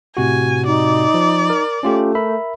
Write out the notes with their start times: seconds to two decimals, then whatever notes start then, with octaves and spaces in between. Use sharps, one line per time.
0.17 A2 C3 F#4 G#5
0.66 D#4 D5
1.14 F3
1.50 A#4
1.83 A3 C#4 F4 G4
2.15 A#4 E5 B5